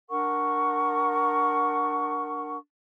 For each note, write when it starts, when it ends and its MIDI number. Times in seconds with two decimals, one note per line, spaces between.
0.09 2.56 62
0.09 2.56 70
0.09 2.56 78
0.09 2.56 85